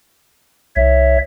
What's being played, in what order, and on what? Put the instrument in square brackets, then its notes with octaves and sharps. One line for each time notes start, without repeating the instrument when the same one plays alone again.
[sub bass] C2 [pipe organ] C#5 E5